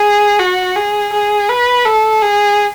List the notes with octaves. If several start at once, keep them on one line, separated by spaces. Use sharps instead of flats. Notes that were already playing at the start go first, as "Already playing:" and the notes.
Already playing: G#4
F#4
G#4
G#4
B4
A4
G#4